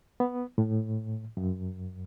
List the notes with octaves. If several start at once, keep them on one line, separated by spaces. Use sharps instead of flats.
B3
A2
F#2